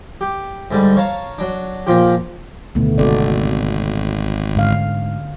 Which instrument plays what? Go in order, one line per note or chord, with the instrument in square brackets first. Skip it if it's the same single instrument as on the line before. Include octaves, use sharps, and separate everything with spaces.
[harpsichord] G4
G#2 D3 G3
C#5 F5 A5 A#5
F#3 D4
A#2 F3 F4 G4
[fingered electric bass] D1 B2 D#3 [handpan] D3 A3 B3
[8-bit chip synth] G#1 [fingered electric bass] C3 [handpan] F#4 A4 D5
[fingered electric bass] G#2 [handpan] D3 C#4 F5